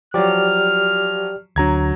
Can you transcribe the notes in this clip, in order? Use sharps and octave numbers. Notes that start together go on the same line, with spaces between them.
F3 F#3 G4 D5 F6
D2 F#3 D4 A#5 G#6